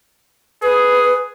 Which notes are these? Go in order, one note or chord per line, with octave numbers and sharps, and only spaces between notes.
G#4 B4